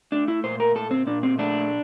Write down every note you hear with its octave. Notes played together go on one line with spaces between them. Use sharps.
A3 D4
E4
A#2 C5
A#4
A#2 A4
C4
A#2 D4
C4
A3 D4